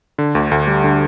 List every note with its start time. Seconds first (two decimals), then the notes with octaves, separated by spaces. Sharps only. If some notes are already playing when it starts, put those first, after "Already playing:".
0.18 D3
0.35 D2
0.51 D2
0.67 G3
0.84 D3